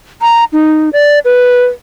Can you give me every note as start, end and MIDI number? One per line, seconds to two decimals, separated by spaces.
0.21 0.44 82
0.53 0.90 63
0.93 1.19 74
1.25 1.63 71